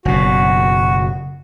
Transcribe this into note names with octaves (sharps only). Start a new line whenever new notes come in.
F#1 B2 F#4